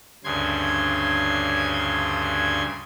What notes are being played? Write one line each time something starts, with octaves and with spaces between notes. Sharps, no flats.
D2 G2 C#3 C6 G#6